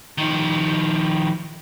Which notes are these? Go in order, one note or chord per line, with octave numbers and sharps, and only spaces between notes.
D#3 F3